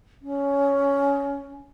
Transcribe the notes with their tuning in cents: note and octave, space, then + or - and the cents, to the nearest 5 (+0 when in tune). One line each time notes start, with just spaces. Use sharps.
C#4 +15